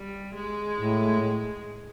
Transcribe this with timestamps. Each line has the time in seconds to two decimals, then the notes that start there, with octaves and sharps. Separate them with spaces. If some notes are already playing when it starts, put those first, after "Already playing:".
Already playing: G3
0.35 G#3
0.78 A2